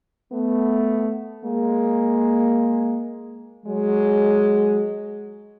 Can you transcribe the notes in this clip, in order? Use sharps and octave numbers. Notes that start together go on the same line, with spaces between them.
A3 B3
G#3 A#3
F#3 G#3